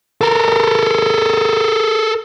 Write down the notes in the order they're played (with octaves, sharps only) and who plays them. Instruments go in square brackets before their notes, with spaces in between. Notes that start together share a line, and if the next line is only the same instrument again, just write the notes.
[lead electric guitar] A4 A#4